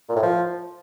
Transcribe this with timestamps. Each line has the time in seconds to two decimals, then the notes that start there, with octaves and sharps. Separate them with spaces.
0.09 A#2
0.16 A2
0.23 F3